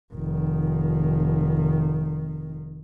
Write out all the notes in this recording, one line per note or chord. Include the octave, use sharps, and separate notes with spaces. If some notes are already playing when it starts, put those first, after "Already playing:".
F1 D#3